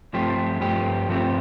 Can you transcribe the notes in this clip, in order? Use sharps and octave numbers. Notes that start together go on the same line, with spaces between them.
G2 F3 A3 C4 G4
G2 F3 A3 C4 G4
G2 F3 A3 C4 G4